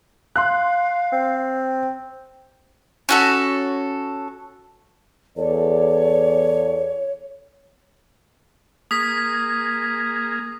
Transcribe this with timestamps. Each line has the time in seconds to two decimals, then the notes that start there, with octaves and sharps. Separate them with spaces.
0.36 F5 C6 F#6
1.12 C4
3.09 C#4 F#4 A4
5.37 E2 A4 C#5 D5
8.91 A#3 G#4 D#6 B6